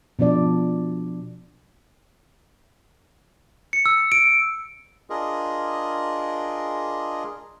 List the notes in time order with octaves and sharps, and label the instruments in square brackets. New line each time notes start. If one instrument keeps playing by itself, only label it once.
[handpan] B2 F3 D4 D5
[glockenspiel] C#7
E6
D7
[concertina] D4 F4 G#4 A#4 D#5